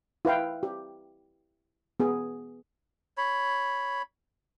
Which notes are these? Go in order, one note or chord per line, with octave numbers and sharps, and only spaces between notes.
E4 B4 F5 G5
G4
B3 G#4
C#5 B5